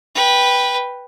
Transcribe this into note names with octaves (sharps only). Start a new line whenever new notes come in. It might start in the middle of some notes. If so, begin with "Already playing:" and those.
B4 G5